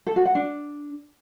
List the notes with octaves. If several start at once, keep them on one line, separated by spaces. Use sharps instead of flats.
A4
F#4
F#5
D4